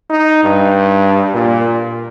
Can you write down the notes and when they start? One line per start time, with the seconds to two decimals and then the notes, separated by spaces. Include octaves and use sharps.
0.10 D#4
0.44 G2
1.35 A#2